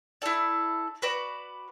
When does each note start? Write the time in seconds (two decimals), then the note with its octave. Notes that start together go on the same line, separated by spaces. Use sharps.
0.22 E4 A4 D5
1.02 F#4 B4 D5